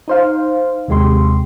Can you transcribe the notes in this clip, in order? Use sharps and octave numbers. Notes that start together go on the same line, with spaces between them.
D#4 C5 F5
D#2 C3 G#3 G4 C6